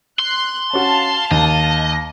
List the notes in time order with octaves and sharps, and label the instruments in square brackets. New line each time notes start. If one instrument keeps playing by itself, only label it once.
[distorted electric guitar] C6 [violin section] F#6
[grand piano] C#4 F#4 [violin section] F5 A5
[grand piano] D#2 [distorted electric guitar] D#5